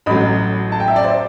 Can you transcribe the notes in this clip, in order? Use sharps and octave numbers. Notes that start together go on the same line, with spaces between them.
A1 A2 F#3 B5
A5
G5
E5
D5
C5